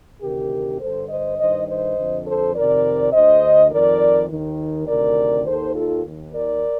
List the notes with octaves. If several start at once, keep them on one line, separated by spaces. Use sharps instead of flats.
D2 C3 D#3 G4 A#4
G2 D3 A4 C5
C5 D#5
G2 D#3 C5 D#5
C5 D#5
F2 D3
A4 C5
F2 C3 D#3 A#4 D5
D2 D3 C5 D#5
F2 D#3 A#4 D5
D#2 D#3
D2 C3 D#3 A#4 D5
D#2 D#3 A4 C5
F4 A4
D#2 D#3
A#4 D5